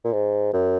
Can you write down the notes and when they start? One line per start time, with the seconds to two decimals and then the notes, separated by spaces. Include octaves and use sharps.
0.04 A#2
0.13 G#2
0.53 F#2